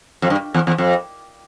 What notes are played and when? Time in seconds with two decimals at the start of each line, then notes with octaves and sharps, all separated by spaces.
0.22 F2
0.30 G2
0.54 E2
0.67 E2
0.78 F2